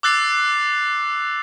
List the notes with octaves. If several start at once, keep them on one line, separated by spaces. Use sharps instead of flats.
D6 E6 F#6 A6 C7 F7